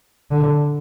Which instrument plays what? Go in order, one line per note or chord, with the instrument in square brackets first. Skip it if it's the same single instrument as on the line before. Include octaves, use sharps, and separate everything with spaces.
[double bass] D3